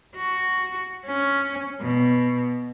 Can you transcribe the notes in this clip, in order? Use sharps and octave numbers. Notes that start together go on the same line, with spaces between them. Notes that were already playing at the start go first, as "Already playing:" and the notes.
F#4
C#4
B2